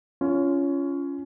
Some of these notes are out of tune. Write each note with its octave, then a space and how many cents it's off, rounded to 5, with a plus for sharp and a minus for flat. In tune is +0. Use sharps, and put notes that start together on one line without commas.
C#4 +15 F4 -20